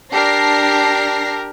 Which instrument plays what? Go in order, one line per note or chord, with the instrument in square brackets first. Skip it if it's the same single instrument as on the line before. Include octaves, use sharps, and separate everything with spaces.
[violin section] D4 A#6 C7 [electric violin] G4 A#4